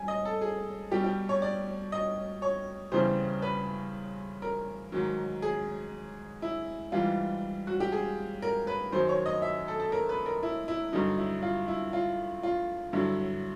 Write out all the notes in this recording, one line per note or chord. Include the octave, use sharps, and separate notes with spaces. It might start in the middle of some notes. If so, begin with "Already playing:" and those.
Already playing: G3 G#5
D#5
A4
G#4
B2 G3 G4
G4
C#5
D5
D#5
C#5
E2 C#3 E3 G3 C5
B4
A#4
G#2 D#3 F#3
G#4
E4
G#2 E3 G3 F4
F#4
G4
G#4
A#4
B4
F#2 D#3 F#3 C5
C#5
D#5
E5
A4
A4
A#4
B4
A#4
E4
E4
G2 D3 F#3 D#4
E4
F4
E4
F4
F4
G2 D3 F#3 E4